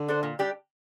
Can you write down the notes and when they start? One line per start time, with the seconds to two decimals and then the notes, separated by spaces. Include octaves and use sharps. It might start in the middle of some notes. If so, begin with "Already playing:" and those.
Already playing: D3
0.08 D4 A4 C5
0.23 A#2
0.39 G3 D4 G4